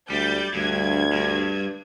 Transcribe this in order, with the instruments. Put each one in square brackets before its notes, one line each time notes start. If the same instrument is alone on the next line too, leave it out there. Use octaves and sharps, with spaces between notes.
[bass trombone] D2 [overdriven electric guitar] G3 [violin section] G6 A6
[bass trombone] D2 [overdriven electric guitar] G2 [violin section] G#6
[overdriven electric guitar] G2